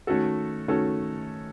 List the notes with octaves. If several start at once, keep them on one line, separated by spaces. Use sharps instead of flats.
D#3 A3 C#4 F#4 A4
D#3 A3 C#4 F#4 A4